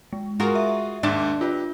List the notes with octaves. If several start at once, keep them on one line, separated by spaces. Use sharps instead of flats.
G#3
F4 F#4 G#4 A#4
E5
D#2 G#2 D4
F4 G4 B4